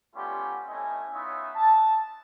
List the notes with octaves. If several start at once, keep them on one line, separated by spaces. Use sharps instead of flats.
G3 A3 B3 C#4 F4 G4
A3 C4 C#4 E4 D#5 G#5
B3 D#4 F4 C#5 E5 D#6
A5